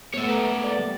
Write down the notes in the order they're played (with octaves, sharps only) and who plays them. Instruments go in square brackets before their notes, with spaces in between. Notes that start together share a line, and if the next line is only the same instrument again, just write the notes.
[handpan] A3 B3 [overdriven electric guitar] C#5 E5
[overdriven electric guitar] A#3 B4
[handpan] D5
G3